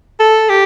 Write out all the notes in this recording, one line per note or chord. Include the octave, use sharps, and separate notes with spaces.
A4
G4